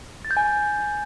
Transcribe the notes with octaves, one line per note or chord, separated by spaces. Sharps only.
A6
G6
G#5